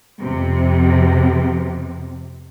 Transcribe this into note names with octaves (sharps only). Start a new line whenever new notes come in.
F2 C3